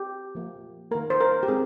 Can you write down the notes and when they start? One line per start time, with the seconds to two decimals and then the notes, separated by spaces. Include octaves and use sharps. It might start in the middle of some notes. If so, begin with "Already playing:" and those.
Already playing: G4
0.35 F3 A#3
0.91 D#3 A#3 A#4
1.10 C5
1.20 A#4
1.43 G4
1.48 G#3 C4 G#4